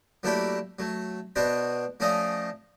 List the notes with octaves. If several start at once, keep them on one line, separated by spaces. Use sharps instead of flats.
F#3 A3 A#3 D4 E4 G4
F#3 A3
B2 B3 D4 F#4 C5 D5
F3 A3 C#4 D5 D#5 F5